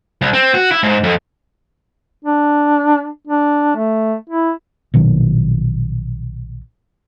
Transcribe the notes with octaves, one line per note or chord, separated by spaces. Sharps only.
C2
C4
F#4
E4
G#2
F2
D4
D4
A3
E4
A#1 B2 D#3 F#3